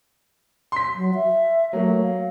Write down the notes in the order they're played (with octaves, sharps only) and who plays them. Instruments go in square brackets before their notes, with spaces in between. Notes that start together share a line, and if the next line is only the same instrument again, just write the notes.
[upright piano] C6 B6
[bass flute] F#3
E5
[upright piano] F#3 A#3 [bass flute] A3
[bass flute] F5